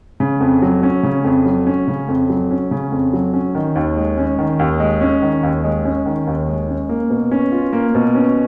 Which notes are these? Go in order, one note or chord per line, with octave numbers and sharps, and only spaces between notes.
C#3
F2
F#3
C#4
C#3
F2
F#3
C#4
C#3
F2
F#3
C#4
C#3
F2
F#3
C#4
D#3
D#2
G#3
C#4
D#3
D#2
G#3
C#4
D#3
D#2
G#3
C#4
D#3
D#2
G#3
C#4
A#3
B2
C#4
F4
A#3
B2
C#4